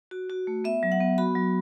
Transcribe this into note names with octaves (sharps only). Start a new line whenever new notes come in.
F#4
F#4
A3
B3 E5
F#3
F#5
B3
F#4 B5
F#3